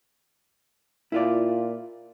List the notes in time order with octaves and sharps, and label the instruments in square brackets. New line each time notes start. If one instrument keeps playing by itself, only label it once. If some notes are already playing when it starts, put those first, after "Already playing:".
[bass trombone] A#2 [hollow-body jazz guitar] E4 F4 D5